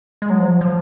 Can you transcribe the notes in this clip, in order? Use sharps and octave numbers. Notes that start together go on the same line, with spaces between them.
G#3
F#3
F3
F3